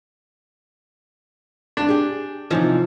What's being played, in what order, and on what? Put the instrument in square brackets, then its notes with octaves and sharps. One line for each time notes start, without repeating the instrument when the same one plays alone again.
[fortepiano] D4
[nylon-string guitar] G4 G#4
[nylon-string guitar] C3 E3 D#4 [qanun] F3 C#4